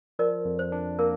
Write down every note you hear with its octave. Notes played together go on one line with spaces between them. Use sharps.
F3 A#4 D5
F2
C5
D4
A#3 A#4